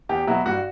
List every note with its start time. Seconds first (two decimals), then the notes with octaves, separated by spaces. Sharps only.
0.09 E2 G4
0.27 B2 F#3 E4
0.46 G2 F#4